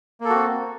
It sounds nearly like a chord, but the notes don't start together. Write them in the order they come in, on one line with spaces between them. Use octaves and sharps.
A#3 A4 F#4 C4